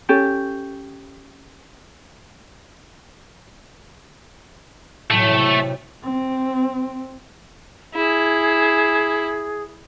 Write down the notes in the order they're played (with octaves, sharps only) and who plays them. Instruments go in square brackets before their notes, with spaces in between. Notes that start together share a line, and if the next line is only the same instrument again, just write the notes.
[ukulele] C#4 G4 A4
[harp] B1 A2 [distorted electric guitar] A3
[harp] B1 C3
[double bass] C4
[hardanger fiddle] E4 [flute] G#4